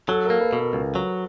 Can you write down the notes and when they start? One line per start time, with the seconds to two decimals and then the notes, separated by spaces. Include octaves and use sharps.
0.09 F#3 A4
0.25 A#3 A#4
0.41 B4
0.53 B2 A#4
0.73 C#2
0.95 F#3